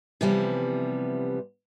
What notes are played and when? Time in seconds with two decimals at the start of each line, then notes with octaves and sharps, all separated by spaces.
0.21 C3 E3 F3 G3 B3